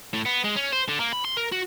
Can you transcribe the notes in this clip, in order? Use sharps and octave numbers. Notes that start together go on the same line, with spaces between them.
A2
B3
G#3
C#4
C5
D3
A#3
B5
C6
A#4
F#4